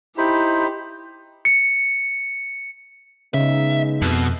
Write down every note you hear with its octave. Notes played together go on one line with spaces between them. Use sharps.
D#4 E4 G4 C5 B5
C#7
C#3 G#3 B3 D#4 E5
F2 B2